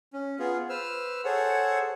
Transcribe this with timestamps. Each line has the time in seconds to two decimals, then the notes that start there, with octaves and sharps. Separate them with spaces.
0.13 C#4
0.39 B3 F4 G#4
0.69 B4 C5 E6 F6
1.25 G#4 A4 C5 C#5 F#5